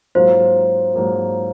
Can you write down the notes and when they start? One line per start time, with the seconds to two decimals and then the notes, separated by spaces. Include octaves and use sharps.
0.15 G#2 F#3 A#3 F4 C5
0.94 G#2 F#3 A#3 F4